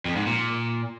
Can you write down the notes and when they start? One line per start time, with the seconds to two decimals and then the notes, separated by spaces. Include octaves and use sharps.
0.05 F2
0.16 G#2
0.27 A#2